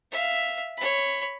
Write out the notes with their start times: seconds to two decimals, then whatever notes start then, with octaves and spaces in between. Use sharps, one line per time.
0.11 E5 F5
0.77 C#5 B5